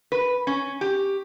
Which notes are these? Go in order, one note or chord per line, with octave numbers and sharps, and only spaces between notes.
B4
C#4
G4